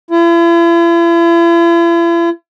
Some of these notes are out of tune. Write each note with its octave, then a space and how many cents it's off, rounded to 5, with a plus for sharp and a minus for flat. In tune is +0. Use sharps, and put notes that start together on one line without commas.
E4 +45